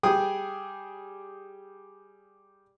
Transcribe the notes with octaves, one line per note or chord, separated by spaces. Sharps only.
G3 G#4 G5 D#6